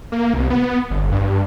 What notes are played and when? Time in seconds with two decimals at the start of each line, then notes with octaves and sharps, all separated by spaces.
0.12 A#3
0.34 C2
0.50 B3
0.90 G1
1.12 G2